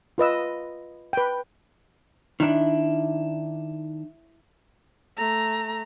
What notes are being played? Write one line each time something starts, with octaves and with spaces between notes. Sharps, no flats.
F4 B4 D#5 E6
B4 G5
D#3 D4 E4
A3 A#5